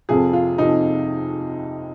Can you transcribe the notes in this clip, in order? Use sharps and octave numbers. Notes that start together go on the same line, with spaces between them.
F2 C3 F3 G#4
F4
F2 C3 F3 D#4